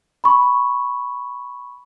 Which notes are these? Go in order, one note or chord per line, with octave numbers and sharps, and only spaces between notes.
B5 C#6